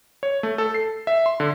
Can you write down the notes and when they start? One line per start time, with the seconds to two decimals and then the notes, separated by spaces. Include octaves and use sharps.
0.23 C#5
0.43 A3
0.58 A4
0.74 C7
1.07 E5
1.26 C6
1.40 D3